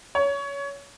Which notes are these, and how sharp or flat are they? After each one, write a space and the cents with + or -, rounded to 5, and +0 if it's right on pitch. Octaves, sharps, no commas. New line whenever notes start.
C#5 +20